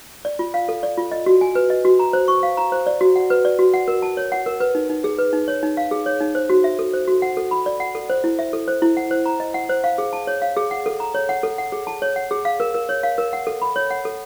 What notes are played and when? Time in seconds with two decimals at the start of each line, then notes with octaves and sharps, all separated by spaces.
0.25 D5
0.39 F4
0.54 F5
0.69 A4
0.83 D5
0.97 F4
1.12 D#5
1.26 F#4
1.41 G#5
1.55 B4
1.70 D#5
1.85 F#4
1.99 A#5
2.13 C5
2.28 C#6
2.43 F5
2.57 A#5
2.72 C5
2.87 D5
3.01 F#4
3.16 F#5
3.30 B4
3.45 D5
3.59 F#4
3.74 F#5
3.88 A#4
4.02 A5
4.17 C#5
4.32 F#5
4.46 A#4
4.60 B4
4.75 D#4
4.90 D#4
5.04 G#4
5.19 B4
5.33 D#4
5.48 C#5
5.63 D#4
5.77 F5
5.91 G#4
6.06 C#5
6.20 D#4
6.35 C5
6.50 F#4
6.64 E5
6.79 A4
6.93 C5
7.08 F#4
7.22 F#5
7.37 A4
7.51 B5
7.66 D5
7.80 F#5
7.95 A4
8.10 C5
8.24 E4
8.39 E5
8.53 A4
8.68 C5
8.82 E4
8.97 F#5
9.11 C5
9.26 A#5
9.40 D#5
9.54 F#5
9.69 C5
9.84 F5
9.98 G#4
10.13 A5
10.27 C#5
10.42 F5
10.57 G#4
10.71 F#5
10.86 A4
11.00 A#5
11.15 C#5
11.29 F#5
11.43 A4
11.58 F#5
11.72 G#4
11.87 A5
12.02 C#5
12.16 F#5
12.31 G#4
12.45 F5
12.60 A#4
12.74 A#4
12.89 C#5
13.03 F5
13.18 A#4
13.33 F#5
13.47 A4
13.62 B5
13.76 C#5
13.90 F#5
14.05 A4